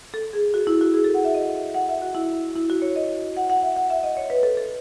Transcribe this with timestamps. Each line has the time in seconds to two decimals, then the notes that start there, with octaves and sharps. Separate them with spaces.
0.14 A4
0.33 G#4
0.54 F#4
0.67 E4
0.81 F#4
0.94 G#4
1.04 A4
1.14 F#5
1.25 E5
1.35 D#5
1.74 F#5
1.89 E5
2.02 F#4
2.15 E4
2.56 E4
2.70 F#4
2.82 C#5
2.96 D#5
3.37 F#5
3.50 F#5
3.63 E5
3.76 F#5
3.90 E5
4.03 D#5
4.17 C#5
4.30 B4
4.43 A4
4.57 A4